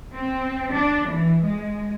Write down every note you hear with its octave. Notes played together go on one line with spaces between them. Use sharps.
C4
D4
E3
G#3